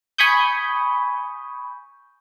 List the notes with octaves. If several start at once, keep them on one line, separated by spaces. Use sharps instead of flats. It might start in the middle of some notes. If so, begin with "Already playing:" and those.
G#5 B5 C#6 D#6 G6